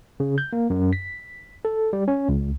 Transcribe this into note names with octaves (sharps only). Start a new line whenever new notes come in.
C#3
G6
A#3
F#2
B6
A4
G3
C#4
C#2